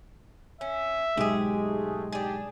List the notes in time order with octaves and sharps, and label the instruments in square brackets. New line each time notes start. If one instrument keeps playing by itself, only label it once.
[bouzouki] C#4 [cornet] E5
[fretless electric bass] B1 G#2 [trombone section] G#3 [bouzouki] G4 G#4
[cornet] A3
[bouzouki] D4 G#4 [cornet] G4